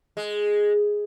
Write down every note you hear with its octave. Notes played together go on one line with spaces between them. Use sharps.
G#3